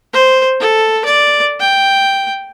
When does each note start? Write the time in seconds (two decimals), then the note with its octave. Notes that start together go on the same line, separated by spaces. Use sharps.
0.13 C5
0.60 A4
1.05 D5
1.60 G5